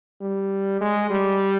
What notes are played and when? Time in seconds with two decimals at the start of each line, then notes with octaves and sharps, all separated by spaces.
0.21 G3
0.81 G#3
1.10 G3